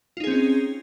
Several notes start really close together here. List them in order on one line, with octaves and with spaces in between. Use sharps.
F4 D#4 G#4 C4 C#4